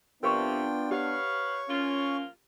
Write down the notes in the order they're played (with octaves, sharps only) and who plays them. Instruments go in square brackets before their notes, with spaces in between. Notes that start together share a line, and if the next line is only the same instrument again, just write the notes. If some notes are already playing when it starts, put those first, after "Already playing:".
[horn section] C3 [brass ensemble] B3 D4 [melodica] F4 G5 [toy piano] A#4 B4 C#6
[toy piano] G4 F#5 [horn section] B4 F5 [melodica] C#5 C#6
[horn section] F3 A#3 F4 [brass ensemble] C#4